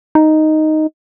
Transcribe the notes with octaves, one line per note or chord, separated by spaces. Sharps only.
D#4